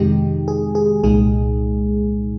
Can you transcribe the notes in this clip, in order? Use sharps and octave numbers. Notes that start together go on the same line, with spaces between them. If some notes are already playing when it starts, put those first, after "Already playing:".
Already playing: F2 C3 D#3 G#3 D#4 G4
G#4
G#4
C2 A#2 G#3 D#4 G#4